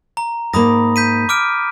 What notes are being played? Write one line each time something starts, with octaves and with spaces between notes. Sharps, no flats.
A#5
G#2 A#3 B5 D#6 A#6
G6 B6 D#7
D6 F6 D7